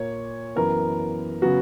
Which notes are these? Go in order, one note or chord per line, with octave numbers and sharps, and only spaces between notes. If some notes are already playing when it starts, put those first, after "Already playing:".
Already playing: A#2 A#3 C#5
F#2 E3 B3 A#4
C#3 F#3 B3 F#4